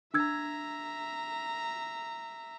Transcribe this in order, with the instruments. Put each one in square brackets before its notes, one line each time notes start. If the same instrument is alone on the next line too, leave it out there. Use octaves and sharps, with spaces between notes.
[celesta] D4 E6 G#6 [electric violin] E5 A#5